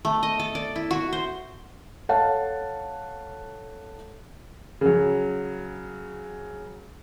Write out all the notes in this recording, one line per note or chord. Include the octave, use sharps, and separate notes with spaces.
A3
D#5
A4
D5
E4
F#4
C5
A4 C#5 F5 F#5 A5
C#3 F#3